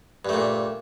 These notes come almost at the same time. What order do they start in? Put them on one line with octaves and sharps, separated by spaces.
G2 A3 A#2